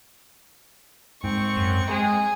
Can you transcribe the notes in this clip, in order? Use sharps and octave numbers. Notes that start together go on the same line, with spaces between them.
G#2 C4 C#6
F#2
G#3 G#4